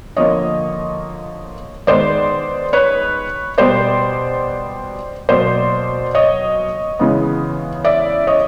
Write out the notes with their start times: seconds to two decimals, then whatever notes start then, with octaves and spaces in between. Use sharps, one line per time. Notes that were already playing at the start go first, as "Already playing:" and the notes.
0.17 D3 F3 A#3 C#5 D#5
1.87 D#3 G#3 B3 C5 D5
2.73 B4 C#5
3.58 B2 G3 B3 C5 D5
5.29 B2 F#3 A#3 C5 D5
6.15 C#5 D#5
6.99 C#3 E3 G#3 B3
7.85 D5 E5
8.27 C#5 D#5